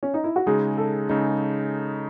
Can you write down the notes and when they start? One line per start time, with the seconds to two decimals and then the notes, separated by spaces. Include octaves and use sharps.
0.03 C#4
0.14 D#4
0.24 E4
0.36 F#4
0.46 C#3 G#3 D#4 G#4
0.78 A4
1.09 C#3 G#3 D#4